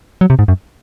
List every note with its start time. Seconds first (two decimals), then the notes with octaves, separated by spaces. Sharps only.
0.21 F#3
0.30 C3
0.39 G#2
0.48 F#2